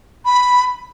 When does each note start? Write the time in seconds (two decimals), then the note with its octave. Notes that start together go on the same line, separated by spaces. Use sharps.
0.25 B5